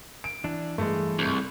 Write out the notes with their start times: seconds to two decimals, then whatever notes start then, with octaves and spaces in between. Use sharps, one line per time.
0.24 D7
0.44 E3 D4
0.78 G2 E3 G#3 A3
1.19 C2